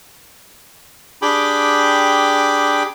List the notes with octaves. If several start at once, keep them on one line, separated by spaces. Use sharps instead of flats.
D4 G4 G#4 G5 B5 D6